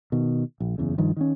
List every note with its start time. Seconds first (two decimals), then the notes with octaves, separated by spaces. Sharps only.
0.12 B2 D#3
0.60 A#1
0.78 F#1 E2 C#3
0.98 G2 D#3 F3
1.17 D#3 C4 C#4